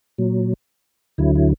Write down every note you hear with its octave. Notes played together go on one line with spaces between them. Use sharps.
A#2 F#3
D2 D3 F#3 E4
E4